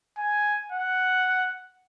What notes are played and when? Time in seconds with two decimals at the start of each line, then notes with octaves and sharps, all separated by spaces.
0.18 G#5
0.72 F#5